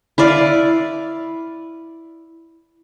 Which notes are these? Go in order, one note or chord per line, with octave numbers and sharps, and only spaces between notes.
E4 B4 D5 F5